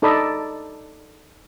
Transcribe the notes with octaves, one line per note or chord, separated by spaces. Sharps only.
D#4 A4 D5 D#5 B5